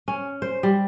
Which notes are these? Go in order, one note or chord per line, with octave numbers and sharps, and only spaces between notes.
C#4
C5
G3